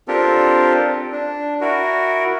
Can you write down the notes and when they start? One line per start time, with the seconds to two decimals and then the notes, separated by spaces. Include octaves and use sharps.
0.08 C4 D4 F4 G4 A4 A#4
1.12 D4
1.61 E4 F#4 A#4